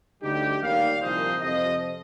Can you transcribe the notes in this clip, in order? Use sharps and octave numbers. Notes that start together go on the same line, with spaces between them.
D2 D3 G3 D#4 G4
D#2 D#3 G3 D5 F5
C2 A#2 F3 C5 D#5
F2 C3 F3 C5 D#5